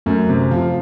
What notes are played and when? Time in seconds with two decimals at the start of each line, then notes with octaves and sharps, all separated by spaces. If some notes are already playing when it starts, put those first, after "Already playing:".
0.06 F#2 A3
0.29 C3
0.51 F3 F4